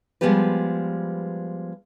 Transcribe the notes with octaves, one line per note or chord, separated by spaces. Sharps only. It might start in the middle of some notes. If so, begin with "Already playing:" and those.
F3 G3 G#3 B3 G4 B4